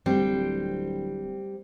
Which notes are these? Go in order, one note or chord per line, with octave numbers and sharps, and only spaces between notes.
D1 G3 C4